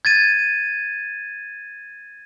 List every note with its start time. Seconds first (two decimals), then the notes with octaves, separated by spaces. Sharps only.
0.05 G#6 A6 D#7